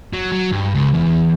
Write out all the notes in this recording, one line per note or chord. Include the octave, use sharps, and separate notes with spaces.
F#3
F#3
G2
C#2
E2